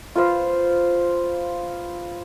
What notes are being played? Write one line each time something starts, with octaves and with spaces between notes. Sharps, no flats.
F4 B4 C5 F5